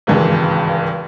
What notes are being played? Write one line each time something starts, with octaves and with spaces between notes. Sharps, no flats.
G#1 C#2 G2 E3 G#3